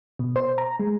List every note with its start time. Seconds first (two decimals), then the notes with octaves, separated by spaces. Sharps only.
0.19 B2
0.36 C5
0.58 A#5
0.79 G#3